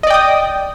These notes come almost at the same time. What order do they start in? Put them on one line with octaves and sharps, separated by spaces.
D#5 D5 G5 D#6